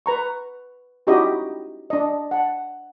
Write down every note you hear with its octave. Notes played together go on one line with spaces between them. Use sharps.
B4 A#5 C#6
C#4 D#4 E4 F#4 G4 D#5
D4 D#5
F#5 A5